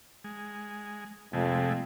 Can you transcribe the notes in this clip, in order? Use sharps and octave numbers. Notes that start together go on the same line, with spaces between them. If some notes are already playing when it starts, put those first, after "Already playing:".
G#3
F2 C3 G#3 A3